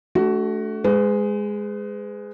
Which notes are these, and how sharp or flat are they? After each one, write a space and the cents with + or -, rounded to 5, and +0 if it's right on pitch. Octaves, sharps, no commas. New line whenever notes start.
A3 -15 D4 -25 F#4 +20
G#3 +0 B4 +40